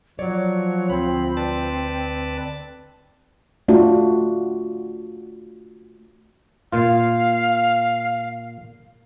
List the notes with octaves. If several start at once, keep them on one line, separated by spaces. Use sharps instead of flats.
F3 F#3 C#5 D5
D2 C4 B5
B4 D5 A5
A3 D4 F4 F#4
A#2 F4 F5